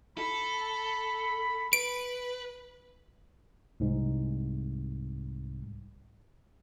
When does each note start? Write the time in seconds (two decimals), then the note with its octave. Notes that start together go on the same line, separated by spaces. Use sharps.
0.18 A4 B5
1.73 B4 D7
3.80 C2 G#2